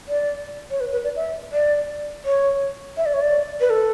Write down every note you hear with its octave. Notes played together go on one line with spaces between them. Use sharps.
D5
C#5
B4
B4
D5
E5
D5
C#5
E5
D5
C#5
D5
B4
A4